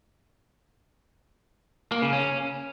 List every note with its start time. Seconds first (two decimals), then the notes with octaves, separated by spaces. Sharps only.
1.92 A#3
2.02 C#3
2.13 C#4